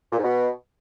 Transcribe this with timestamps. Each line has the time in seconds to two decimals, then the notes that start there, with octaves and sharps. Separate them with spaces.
0.12 A#2
0.18 G#2
0.24 B2